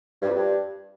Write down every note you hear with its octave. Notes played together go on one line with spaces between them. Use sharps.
G2
F2
G2